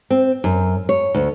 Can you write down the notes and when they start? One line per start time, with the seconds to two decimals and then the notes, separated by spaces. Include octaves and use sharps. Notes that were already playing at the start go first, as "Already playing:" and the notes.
0.10 C4
0.44 F#2
0.89 C#5
1.14 D2